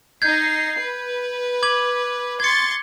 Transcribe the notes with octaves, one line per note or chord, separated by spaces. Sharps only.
D#4 G6 G#6 C7
B4
D6 G#6 F#7
C6 C#6 G#6 A6 C#7